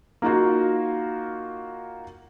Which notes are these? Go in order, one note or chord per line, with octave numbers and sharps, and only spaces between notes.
A#3 D#4 F4 F#4